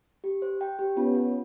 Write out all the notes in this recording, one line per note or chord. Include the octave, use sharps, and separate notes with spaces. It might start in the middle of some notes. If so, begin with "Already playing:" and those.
G4
C5
G5
G4
B3 C#4 F4
F4